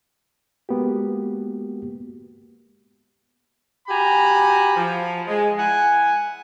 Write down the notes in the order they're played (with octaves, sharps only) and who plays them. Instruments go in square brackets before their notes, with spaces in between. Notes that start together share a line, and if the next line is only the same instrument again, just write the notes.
[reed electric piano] G#3 A#3 B3 F#4 G4
[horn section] F#4 G4 G#5 A#5 B5
F3
G#3
E4 F#5 G#5